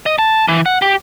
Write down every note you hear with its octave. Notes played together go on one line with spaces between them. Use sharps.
D#5
A5
E3
F#5
G4